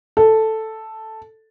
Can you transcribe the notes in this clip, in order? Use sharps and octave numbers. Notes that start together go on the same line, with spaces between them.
A4